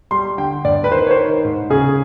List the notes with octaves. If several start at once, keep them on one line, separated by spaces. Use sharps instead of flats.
G3 C6
D3 G5
G2 D5
B4
D#3 C5
C#5
C5
D#3
G#2
C#3 G#4